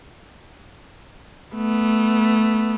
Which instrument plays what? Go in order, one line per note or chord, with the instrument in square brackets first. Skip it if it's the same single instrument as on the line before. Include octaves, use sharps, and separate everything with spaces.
[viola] A3 B3